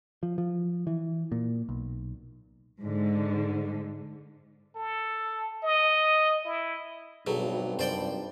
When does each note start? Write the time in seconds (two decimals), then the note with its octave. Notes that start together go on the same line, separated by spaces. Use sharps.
0.23 F3
0.38 F3
0.87 E3
1.32 A#2
1.69 B1
2.81 G#2 D3
4.76 A4
5.64 D#5
6.45 E4
7.27 G#1 G2 B2 F#3 G#4 A4
7.79 F#2 C3 C5 D5 G5